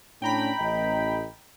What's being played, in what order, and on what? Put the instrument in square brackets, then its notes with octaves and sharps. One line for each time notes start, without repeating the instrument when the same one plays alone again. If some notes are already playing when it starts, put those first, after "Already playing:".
[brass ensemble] A2 C#4 D4 [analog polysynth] G5 A#5 B5
[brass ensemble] A1 D#5